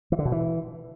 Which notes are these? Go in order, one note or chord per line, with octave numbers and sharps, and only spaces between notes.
E3
D3
B2
E3